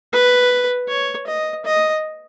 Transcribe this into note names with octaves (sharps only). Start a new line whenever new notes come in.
B4
C#5
D#5
D#5